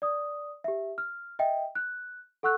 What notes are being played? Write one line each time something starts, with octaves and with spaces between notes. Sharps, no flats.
D5 D#6
G4 E5
F6
D#5 E5 G5
F#6
A4 F#5 C#6 E6 F#6